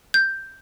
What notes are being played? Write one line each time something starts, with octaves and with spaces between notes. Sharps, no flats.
G6